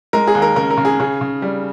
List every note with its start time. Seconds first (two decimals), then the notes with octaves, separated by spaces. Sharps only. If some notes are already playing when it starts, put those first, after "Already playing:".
0.13 G#3 A#4
0.27 G#4
0.35 D#2
0.42 A#4
0.56 C#3 A#4
0.71 A#4
0.77 C#3
0.85 G#4
1.00 C#3 G#4
1.21 C#3
1.42 G3